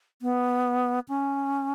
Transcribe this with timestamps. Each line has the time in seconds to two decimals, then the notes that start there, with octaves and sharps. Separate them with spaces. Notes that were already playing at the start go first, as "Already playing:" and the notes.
0.22 B3
1.09 C#4